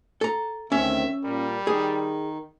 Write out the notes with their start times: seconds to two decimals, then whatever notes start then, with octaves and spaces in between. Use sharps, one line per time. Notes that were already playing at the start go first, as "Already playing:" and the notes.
0.21 A4 A#5
0.72 D2 D#3 C4 C#4 E5
1.24 A#2 G3 A#4
1.67 D#3 D#4 G#4